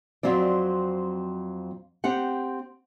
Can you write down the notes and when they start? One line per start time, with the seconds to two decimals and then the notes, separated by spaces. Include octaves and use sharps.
0.23 F2 F#3 C4 D5
2.04 C4 G4 F#5